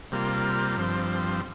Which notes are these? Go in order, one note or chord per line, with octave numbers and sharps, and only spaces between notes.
C3 G3 A#3 F4
G2 F3 C4